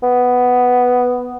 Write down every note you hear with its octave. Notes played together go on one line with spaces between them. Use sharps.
B3